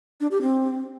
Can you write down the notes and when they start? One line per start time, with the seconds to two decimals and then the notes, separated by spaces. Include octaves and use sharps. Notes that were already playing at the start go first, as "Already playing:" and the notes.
0.21 D4
0.31 G4
0.42 C4